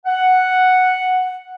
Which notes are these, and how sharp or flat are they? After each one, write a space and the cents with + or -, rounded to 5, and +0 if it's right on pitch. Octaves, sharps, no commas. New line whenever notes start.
F#5 +0